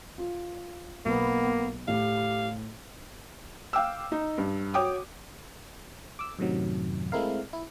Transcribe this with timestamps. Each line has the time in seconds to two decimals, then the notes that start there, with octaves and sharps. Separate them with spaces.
0.18 F4
1.06 B1 A#3 B3
1.88 A2 G4 F5
3.73 F5 G5 D6 E6
4.12 D#4
4.38 G2
4.74 F#4 C#5 G5 D6 D#6
6.19 D6 E6
6.39 F#2 A2 C3 D#3 F#3
7.12 G#3 A3 C4 E4 A#4 F5
7.53 E4